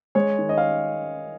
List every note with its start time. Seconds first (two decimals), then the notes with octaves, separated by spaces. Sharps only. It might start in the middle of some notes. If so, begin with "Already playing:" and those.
0.15 G#3 C#5
0.39 D#3
0.49 D#5
0.58 F5